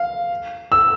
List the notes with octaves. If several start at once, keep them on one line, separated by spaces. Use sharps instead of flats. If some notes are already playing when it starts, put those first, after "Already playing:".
Already playing: F5
E6